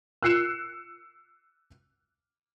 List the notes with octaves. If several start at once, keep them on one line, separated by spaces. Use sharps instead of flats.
E6 F#6 C7 C#7 E7